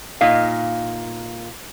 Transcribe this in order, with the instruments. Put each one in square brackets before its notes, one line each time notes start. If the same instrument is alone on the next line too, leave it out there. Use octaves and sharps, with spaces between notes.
[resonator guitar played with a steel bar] A#2 D#4 F5